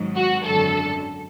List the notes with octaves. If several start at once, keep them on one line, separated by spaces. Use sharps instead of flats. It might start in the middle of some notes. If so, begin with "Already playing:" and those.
Already playing: G#1 G#2 F#3
F#4
G#1 F#2 D3 F#3 A4